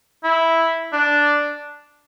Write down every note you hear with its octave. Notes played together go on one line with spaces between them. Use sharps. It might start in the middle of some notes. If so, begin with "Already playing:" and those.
E4
D4